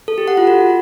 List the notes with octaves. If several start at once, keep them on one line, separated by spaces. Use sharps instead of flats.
A4
G4
F#5
F4
F#4